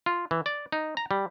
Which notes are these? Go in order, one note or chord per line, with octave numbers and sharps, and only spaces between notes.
F4
E3
D5
D#4
A#5
G3